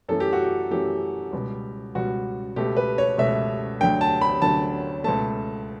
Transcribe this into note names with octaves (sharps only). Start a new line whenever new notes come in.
F#2 E3 A3 A4
G4
F#4
G4
F#2 E3 A3 G4
C#2 B2 G3
C#2 B2 G3 F#4
C#2 B2 A3 G4
B4
C#5
C#2 B2 A3 E5
D2 D3 F#3 G5
A5
B5
D2 D3 F#3 A5
C#2 B2 A3 A5